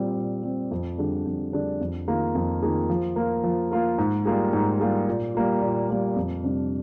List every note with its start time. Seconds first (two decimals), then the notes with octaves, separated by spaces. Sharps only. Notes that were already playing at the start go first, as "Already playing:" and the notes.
Already playing: A#2 G3 C4
0.17 A#2
0.44 G3 C4
0.71 F2
0.98 D3 G3 D4 G#4
1.26 F2
1.53 D3 G3 D4 G#4
1.81 F2
2.07 D#3 A#3 F4 G#4
2.35 F2
2.62 D#3 A#3 F4 G#4
2.90 F3
3.16 A#3 F4 A#4
3.44 F3
3.71 A#3 F4 A#4
3.98 G#2
4.25 G3 A#3 F4 G#4
4.53 G#2
4.80 G3 A#3 F4 G#4
5.08 A#2
5.35 G3 A#3 F4
5.62 A#2
5.89 G3 A#3 F4
6.16 F2
6.44 C3 G3 D4